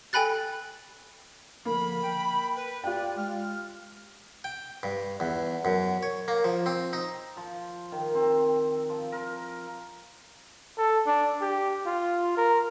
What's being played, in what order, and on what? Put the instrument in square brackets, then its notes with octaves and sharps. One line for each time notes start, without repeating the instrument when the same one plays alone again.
[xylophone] A4 G5 G#5 B5 F#6 A6
[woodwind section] D3 F3 [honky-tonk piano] A#3 [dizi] B5
[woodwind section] G5
[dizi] B4
[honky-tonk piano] F4 G4 G5 [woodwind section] D5 [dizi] F#6
[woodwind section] G#3 [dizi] F6
[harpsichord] G5
G2
E2
F#2
C#5
A#3
F3
C4
D#4
[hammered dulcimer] F3
D#3
C4
F3
A#4
[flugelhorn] A4
D4
G4
F4
A#4